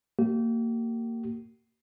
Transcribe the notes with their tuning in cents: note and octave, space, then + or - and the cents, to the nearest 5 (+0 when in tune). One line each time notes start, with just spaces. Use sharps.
A#3 -25 G4 -40